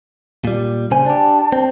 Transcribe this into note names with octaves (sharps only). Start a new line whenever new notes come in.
A#2 G3
C#3 C5 G#5
D4 G4 A5
C4